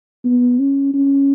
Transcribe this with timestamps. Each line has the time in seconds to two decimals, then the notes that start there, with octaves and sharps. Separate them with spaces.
0.25 B3
0.59 C#4
0.94 C#4